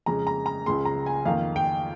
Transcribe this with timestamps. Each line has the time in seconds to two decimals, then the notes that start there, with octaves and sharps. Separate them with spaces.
0.06 F2 C#3 G#3 A#5
0.27 A#5
0.46 A#5
0.66 C#2 C#3 G#3 C6
0.85 A#5
1.06 G#5
1.26 F2 D#3 A#3 F5
1.56 G5